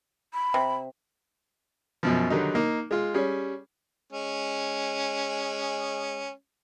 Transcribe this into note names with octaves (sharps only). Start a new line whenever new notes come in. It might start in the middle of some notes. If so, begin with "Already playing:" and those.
B5
C3
F#2 B2 F3
D3 D#3 F#3 G3 D#4
A#3 D#4
G#3 F4
G3 C#4 G#4
G#3 C#4